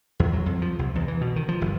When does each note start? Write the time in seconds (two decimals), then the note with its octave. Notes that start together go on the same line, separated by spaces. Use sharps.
0.20 E2
0.34 F#3
0.46 F2
0.62 F3
0.79 C2
0.95 E2
1.08 E3
1.21 B2
1.36 D#3
1.48 F3
1.61 G1